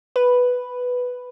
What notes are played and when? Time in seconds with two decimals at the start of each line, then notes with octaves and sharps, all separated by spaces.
0.16 B4